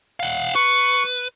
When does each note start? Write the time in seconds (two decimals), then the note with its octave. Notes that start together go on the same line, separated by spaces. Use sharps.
0.20 F5 F#5
0.55 B4 C#6